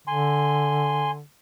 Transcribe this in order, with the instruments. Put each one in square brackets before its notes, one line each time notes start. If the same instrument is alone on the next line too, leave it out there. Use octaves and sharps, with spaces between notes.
[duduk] D3 [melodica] G#5 C6